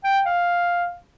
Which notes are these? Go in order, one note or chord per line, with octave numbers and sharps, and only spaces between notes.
G5
F5